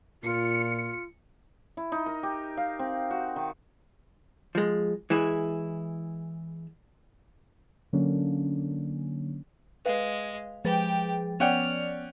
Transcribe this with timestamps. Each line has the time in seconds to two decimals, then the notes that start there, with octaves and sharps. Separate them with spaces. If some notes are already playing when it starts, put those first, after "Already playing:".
0.23 A#2 F4 C#7
1.77 E4
1.92 D#4
2.06 A#4
2.23 G4
2.57 F5
2.79 C4
3.11 F#4
3.36 D#3
4.55 F3 G#3
5.10 E3 G#3 E4 G#4
7.93 D3 F#3 A#3 C#4 D4
9.86 G#3 B4 F5
10.65 F3 G#3 G4 G#4 B4 G5 A6
11.40 B3 C#4 D5 F#5 G5 F6